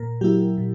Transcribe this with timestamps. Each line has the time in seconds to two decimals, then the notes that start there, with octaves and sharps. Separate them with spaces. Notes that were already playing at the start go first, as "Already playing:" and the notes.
Already playing: A#2 A#4
0.21 F#3 A#3 E4 G4
0.57 A#2